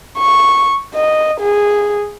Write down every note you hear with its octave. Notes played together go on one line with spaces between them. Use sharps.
C#6
D#5
G#4